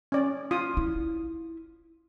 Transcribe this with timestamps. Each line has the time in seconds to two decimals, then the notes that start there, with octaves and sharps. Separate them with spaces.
0.12 C#4 D5
0.51 F4 D#6
0.77 E4